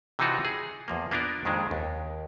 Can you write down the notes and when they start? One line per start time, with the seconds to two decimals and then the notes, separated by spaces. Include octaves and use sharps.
0.19 C3 E3 C4 D#4 F4 F#4
0.45 G#4
0.88 E2 F3 A#3
1.11 A#3 B3 D4 F4 A#4
1.45 F2 D#3 G#3 D4
1.71 D#2